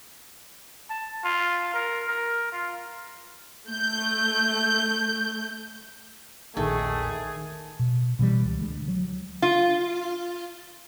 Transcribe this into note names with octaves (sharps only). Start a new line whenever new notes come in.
A5
F4
A#4
A#4
F4
A3 G6
A#1 E2 D#3 A3 G#4
B2
B2 E3 G3
C#2
D2 G#3
F#3
F4